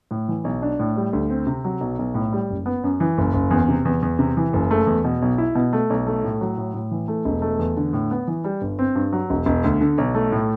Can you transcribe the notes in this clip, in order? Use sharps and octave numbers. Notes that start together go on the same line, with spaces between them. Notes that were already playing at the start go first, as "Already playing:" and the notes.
A2
E3
B1
D4
A2
G3
D2
C4
C3
F#3
B1
B1
A2
G3
F#1
B3
F#2
E3
F#1
F#1
E2
C3
E2
E2
C3
E3
F#1
A3
E2
B2
B1
E4
B2
A3
B1
A3
A2
F#3
A2
A2
E3
A3
E1
A3
E2
D3
A2
B3
E3
G3
G1
C4
G2
F#3
E1
E1
D2
D3
B1
A3
A2